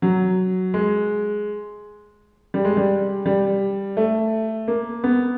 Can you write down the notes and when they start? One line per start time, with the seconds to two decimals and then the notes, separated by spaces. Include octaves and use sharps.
0.02 F#3
0.74 G#3
2.54 G3
2.65 G#3
2.77 G3
3.26 G3
3.97 A3
4.68 A#3
5.04 B3